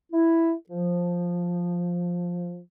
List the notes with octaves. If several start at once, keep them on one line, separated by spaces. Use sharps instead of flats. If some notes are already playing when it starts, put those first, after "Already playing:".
E4
F3